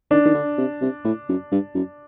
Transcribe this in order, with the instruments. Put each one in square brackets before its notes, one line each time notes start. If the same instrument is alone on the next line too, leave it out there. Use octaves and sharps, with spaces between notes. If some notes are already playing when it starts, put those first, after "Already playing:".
[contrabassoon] D#3 [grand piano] D4
[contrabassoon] D#3
D3
C3
C3
A2
F#2
G2
F#2